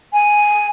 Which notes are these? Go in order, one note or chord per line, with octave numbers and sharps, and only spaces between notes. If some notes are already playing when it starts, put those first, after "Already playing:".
G#5